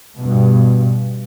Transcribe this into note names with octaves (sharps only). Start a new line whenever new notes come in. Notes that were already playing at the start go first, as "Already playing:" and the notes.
G2 B2